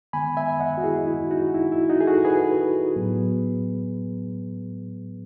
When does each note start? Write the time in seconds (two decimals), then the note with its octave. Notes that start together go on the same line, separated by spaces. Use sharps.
0.13 D#3 G#3 B3 G#5 B5
0.37 E5 G#5
0.60 D#5 F#5
0.78 F#4
0.84 E4 G#4
1.07 E4
1.31 D#4 F#4
1.54 E4
1.72 E4
1.89 D#4 F#4
2.01 G#4
2.07 F#4 A4
2.25 G#4 B4
2.96 A2 F#3 B3